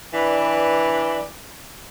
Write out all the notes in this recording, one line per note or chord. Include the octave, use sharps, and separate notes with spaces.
E3 D4 B4 D5